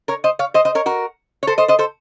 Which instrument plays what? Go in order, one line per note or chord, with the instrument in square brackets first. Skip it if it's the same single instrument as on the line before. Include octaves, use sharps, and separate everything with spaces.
[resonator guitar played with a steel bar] A#4 C#5
C5 D#5
C#5 F5
C5 D#5
C5 D#5
A#4 C#5
F#4 A#4
C#5
A4 C5
C5 D#5
C5 D#5
A4 C5